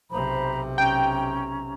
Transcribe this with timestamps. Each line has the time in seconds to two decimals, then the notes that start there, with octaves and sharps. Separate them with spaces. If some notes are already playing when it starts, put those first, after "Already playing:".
0.11 B1 C3 C5 A#5 B5
0.78 C#4 G5 A#5